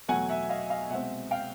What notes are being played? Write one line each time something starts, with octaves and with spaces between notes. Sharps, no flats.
E2 B2 F#3 A3 F#5 G#5
E5 F#5
D#5 F5
D#5 F5
C2 B2 G#3 C4 E5 F#5
F5 G5